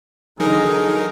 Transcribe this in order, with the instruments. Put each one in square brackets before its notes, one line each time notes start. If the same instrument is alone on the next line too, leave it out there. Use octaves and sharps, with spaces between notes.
[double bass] D3 D#3 [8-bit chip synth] F#3 D#4 A#4 [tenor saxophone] G#4